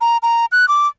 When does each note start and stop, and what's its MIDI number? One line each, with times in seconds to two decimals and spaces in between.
0.01 0.17 82
0.23 0.45 82
0.52 0.68 90
0.68 0.87 86